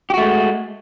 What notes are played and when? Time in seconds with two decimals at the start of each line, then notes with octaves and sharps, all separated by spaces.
0.10 G4
0.14 F#4
0.18 A3
0.21 G#3